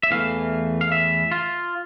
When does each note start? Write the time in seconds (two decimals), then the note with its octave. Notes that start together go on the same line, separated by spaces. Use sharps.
0.03 E5
0.11 E2 E3 A3 F5
0.81 F5
0.92 E5
1.32 F4